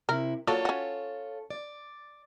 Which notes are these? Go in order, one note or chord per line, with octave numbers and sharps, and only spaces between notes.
C3 E4 A#4
F#3 A#3 D4 F4 A4 C#5
C#4 F#4
D5